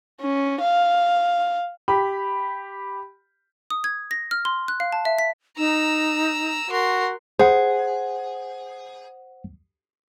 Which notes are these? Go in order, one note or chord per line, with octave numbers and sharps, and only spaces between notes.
C#4
F5
G4 B5
D#6
G#6
A#6
F6
C6
F#6
F5
A5
E5
B6
D#4 A#5 E6
F#4 A#4 C6
G#4 C5 F#5